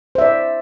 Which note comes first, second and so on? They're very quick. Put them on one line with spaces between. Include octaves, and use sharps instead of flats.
C5 E5 D5